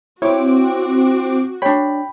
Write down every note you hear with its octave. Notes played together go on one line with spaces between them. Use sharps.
C4 E4 F#4 C#5 D6
D4 C#5 G5 B5